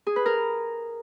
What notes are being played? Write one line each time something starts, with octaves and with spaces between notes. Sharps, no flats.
G#4
B4
A#4